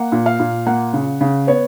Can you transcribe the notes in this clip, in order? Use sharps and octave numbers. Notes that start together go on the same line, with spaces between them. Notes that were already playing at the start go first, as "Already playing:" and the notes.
Already playing: A#3 F#5
A#2
F5
A#2
A#3 F#5
C#3
C#3
B3 C#5